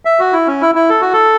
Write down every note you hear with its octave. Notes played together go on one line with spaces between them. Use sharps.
E5
F#4
E4
C#4
E4
E4
A4
F#4
A4